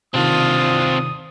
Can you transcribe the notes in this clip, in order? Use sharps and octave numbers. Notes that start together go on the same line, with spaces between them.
C3 D#3 C4 D4 F4 D#6